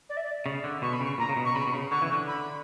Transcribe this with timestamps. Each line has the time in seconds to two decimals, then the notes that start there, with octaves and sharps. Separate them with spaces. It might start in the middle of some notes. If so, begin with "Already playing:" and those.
0.09 D5
0.17 E5
0.23 D5
0.46 C#3
0.64 D3
0.82 B2 C#6
0.93 B5
1.01 C#3 C#6
1.18 A#2 A#5
1.29 C#3
1.37 B2
1.45 C#6
1.55 C#3 B5
1.67 B2
1.73 C#3
1.91 D3 C#6
2.02 E3
2.12 D3
2.27 B5